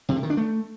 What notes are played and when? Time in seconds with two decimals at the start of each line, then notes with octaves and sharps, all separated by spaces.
0.09 C3
0.16 D3
0.23 D#3
0.30 D4
0.37 A3